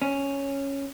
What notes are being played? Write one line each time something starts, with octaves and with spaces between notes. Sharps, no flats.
C#4